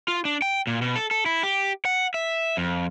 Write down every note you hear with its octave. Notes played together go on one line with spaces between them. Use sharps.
F4
D4
G5
A#2
B2
A4
A4
E4
G4
F#5
E5
F2